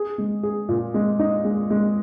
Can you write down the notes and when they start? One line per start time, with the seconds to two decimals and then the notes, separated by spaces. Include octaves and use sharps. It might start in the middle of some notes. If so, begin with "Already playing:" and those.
Already playing: G#4
0.18 G#3
0.43 G#4
0.69 A#2
0.94 G#3
1.19 D#4
1.44 G#3
1.70 G#3